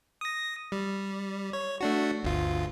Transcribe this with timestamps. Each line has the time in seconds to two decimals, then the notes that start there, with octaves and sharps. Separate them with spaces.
0.21 D#6 A#6
0.72 G3
1.53 C#5
1.80 A3 D4 F#4
2.23 G1 D2 F4